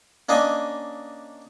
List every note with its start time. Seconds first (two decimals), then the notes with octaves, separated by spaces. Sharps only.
0.29 A#3 C#4 D4 D#5 F5 G#5